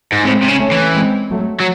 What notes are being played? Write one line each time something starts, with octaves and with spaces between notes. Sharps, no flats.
G#2
A2 G#3 C4
C3
C#3
A3 C#4
E3
G#3 C4
F#3 A3
F#3